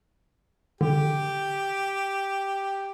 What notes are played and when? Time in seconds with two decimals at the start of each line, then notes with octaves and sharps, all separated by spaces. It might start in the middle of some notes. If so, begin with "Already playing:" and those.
0.81 D3 G4